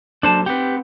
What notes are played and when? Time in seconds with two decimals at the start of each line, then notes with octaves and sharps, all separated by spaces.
0.23 F#3 A#3 D4 A4 C5 A5
0.46 C4 G4 B4 F#5 G5